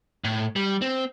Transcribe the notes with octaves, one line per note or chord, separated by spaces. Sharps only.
A2
G3
C4